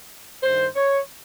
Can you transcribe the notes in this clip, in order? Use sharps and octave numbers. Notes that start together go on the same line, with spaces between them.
G2 D#3 C5
C#5